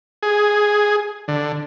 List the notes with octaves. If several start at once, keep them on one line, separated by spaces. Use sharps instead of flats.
G#4
D3